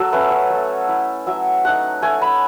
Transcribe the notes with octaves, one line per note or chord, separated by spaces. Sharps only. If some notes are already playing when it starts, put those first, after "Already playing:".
Already playing: F#3 A4
A3 C#4 B4
C#5
A3
E4
F#3 E5
A3 D#4 F#5
A3 G#5
B5